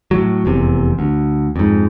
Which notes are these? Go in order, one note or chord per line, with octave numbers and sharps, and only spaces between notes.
A2 F#3
F1 E2 C3
D2
F2 G#2